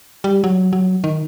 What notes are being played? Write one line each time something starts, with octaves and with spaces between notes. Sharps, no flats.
G3
F#3
F#3
D#3